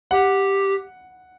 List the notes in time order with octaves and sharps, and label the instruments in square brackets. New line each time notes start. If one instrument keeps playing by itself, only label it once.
[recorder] G4 [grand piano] F#5